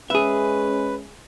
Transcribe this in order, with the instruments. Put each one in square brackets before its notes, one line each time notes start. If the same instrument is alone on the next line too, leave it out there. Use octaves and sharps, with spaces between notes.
[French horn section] G#3 C#4 [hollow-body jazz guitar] G#4 E5 [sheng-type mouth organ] B4